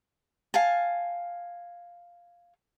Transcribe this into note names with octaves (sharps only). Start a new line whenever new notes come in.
F5 G#5 A5